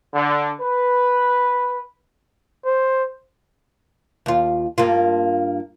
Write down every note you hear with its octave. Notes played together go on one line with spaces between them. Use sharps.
D3
B4
C5
D#2 F4
G2 A#3 F4